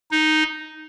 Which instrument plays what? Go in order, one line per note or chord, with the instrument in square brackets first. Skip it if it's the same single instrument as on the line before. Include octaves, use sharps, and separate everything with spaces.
[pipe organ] D#4